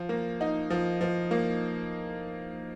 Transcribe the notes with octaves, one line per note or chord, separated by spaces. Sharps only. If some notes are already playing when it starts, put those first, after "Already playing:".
Already playing: F3
A#3
D#4
F3
F3
A#3